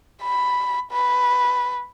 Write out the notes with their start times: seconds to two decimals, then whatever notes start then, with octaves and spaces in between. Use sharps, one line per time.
0.23 B5
0.92 B4